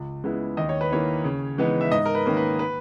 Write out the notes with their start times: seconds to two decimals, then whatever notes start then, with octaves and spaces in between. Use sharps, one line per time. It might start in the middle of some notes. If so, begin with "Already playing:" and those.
Already playing: C#2
0.24 C#3 G#3 B3 E4
0.57 D#2 D#5
0.69 C#5
0.81 B4
0.91 D#3 A#3 E4 C#5
1.24 C#3
1.58 E3 G#3 B3 D#4
1.81 E5
1.92 G#2 D#5
2.06 A#4
2.15 B4
2.25 D#3 A#3 C#4
2.37 B4
2.59 B4